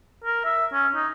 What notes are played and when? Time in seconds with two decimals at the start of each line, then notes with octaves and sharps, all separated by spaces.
0.24 A#4
0.45 E5
0.73 C#4
0.95 D#4